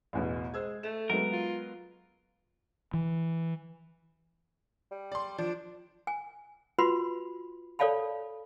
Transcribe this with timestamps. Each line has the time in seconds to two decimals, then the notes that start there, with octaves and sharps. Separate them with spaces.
0.13 A1 E2 B2
0.54 G#3 C5 E6 G#6
0.83 A3 E7
1.10 F#3 G#3 B3 A#4
1.32 F4
2.94 E3
4.91 G3
5.12 D5 C6
5.38 F3 D4
6.07 G#5
6.78 F4 F#4 B4 B5 C6
7.79 A4 C#5 D5 F5 A5 B5